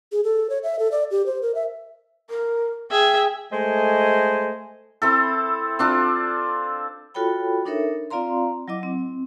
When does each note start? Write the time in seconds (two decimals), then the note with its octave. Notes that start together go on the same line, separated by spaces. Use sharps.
0.12 G#4
0.24 A4
0.50 C#5
0.63 E5
0.79 A4
0.92 D5
1.11 G4
1.26 C5
1.42 A#4
1.55 E5
2.30 A#4
2.91 G#4 E5 G5
3.53 G#3 A3 C5 D#5 G#5
5.02 C4 E4 A4
5.79 C4 D4 F4 A4
7.15 F4 F#4 A4 C#5 G5 B5
7.65 D4 D#4 A4 A#4 C#5 E5
8.10 C4 F4 D5 F5 A#5 C6
8.68 F#3 E4 D#5 D6
8.83 C4